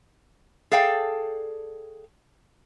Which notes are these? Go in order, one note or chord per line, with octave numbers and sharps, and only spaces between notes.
G#4 A4 D5 F5 G5 A5